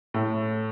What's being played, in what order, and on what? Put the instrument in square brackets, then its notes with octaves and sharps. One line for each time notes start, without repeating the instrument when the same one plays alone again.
[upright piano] A2